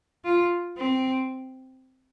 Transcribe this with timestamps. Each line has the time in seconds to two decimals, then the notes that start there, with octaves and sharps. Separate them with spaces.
0.25 F4
0.78 C4